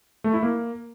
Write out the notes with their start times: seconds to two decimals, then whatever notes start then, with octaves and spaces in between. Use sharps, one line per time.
0.24 A3
0.33 E4
0.43 A#3